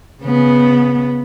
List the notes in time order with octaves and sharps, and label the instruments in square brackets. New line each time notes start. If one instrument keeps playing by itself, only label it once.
[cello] C#3 B3